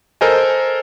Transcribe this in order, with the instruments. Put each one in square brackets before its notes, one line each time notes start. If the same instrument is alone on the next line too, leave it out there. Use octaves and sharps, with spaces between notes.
[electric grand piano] A4 A#4 C5 D#5 G#5